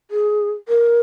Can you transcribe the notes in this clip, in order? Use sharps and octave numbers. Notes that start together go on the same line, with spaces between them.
G#4
A#4